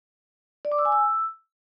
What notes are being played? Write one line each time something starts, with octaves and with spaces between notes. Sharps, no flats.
D5
D6
E6
G#5
E6